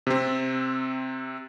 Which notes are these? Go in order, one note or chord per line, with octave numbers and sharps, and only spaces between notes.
C3 C4